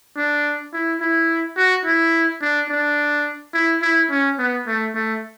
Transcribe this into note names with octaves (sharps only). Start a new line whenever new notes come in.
D4
E4
E4
F#4
E4
D4
D4
E4
E4
C#4
B3
A3
A3